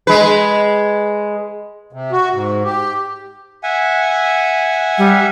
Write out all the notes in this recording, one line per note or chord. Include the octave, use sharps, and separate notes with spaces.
G#3 B4
C3
F#4
G#2
G4
E5 F#5 G#5
G3